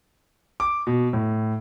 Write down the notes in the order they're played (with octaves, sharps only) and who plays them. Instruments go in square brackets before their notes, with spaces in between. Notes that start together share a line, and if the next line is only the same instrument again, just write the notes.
[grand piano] D6
B2
A2